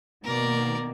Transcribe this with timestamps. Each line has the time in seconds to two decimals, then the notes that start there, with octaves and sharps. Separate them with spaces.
0.24 B2 D#3 A#3 A#4 D5